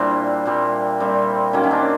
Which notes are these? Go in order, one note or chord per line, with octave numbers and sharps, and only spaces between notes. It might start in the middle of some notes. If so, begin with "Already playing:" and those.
Already playing: A#2 G3 C4 D4 E4
A#2 G3 C4
A#2 G3 C4
D#3 F#3 A#3 C#4
C#4
C4 D4